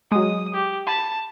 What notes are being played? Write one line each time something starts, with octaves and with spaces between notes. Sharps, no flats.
F#3 G#3 D#6
G4
A5 B5